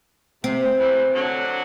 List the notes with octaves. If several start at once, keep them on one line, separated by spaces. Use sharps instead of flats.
C3 C4
C3 E3
D3 F#3